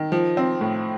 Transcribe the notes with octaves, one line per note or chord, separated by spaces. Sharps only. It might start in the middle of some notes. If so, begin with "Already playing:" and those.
Already playing: D#3
F3
C4
A2